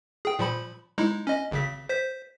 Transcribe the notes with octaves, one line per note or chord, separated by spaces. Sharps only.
G#4 G5
A#2 F3 B5
G#3 D#4 E4
C#4 D#5
G#1 C#3 B6
C5 B6